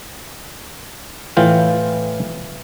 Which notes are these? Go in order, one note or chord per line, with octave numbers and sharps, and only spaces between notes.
A2 E3 F4 G5